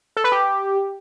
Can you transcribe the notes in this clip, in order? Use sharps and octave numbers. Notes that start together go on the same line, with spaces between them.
A4
B4
G4